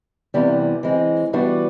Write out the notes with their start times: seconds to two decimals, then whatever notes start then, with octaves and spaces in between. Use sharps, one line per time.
0.34 E2 C3 E3 G3 B3
0.83 E3 G#3 C4
1.33 E3 G3 B3 D4 F#4